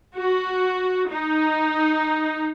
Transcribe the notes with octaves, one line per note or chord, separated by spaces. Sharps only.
F#4
D#4